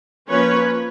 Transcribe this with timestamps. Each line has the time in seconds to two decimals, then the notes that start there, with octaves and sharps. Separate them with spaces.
0.29 F3 A#3 C#4 B4 C#5